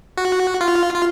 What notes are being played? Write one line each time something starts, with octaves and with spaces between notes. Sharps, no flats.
F#4
F4
F4